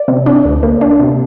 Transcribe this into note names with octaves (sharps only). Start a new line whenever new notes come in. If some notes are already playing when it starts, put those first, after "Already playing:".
Already playing: D5
C3
D4
D2
A#3
D4
C3